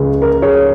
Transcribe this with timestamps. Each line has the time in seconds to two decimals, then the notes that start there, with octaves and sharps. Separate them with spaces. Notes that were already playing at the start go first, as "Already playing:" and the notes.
Already playing: C#2 C#3 G#3
0.22 A#4
0.42 G#4 C#5